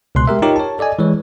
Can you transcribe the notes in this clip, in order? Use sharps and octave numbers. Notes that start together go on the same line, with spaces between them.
C#2 B2 C6 F#6
G#3 G4 A#4 E5
D#4 F4 G4 A#4 C#5
C#5 A5
A4 D5 D#5 G#5
E3 G#3 C#5